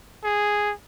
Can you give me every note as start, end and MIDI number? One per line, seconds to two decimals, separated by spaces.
0.24 0.72 68